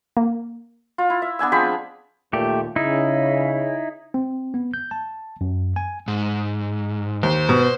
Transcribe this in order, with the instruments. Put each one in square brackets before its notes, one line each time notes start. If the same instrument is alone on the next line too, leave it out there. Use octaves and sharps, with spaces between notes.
[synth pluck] A#3
[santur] F4
E4
E5
B3 D4 G#5 E6
F3 G#3 C4 B5
[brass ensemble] D#2 A#2 [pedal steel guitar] A3 G4
[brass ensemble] C#3 [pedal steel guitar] D#4 E4
[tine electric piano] C4
B3
G6
A5
F#2
G#5
[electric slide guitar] G#2
[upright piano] D#2 [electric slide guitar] C5
[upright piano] B2